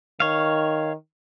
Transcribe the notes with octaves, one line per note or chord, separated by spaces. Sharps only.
D#3 C#5 F5